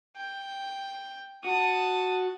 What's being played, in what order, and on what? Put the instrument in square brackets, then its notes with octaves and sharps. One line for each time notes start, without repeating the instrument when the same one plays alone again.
[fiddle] G5
[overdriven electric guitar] F#4 [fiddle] A5 D#6